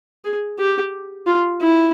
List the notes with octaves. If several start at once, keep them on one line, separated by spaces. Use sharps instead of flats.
G#4
G4
F4
E4